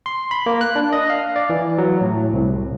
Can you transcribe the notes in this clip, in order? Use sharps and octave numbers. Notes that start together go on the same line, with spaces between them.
C6
B5
A#3
F#6
D4
D#5
F5
D5
E3
F#3
A2
C2